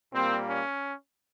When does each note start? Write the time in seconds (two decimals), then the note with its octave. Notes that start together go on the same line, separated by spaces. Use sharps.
0.13 A#2 G3 A#3 C4
0.46 C#4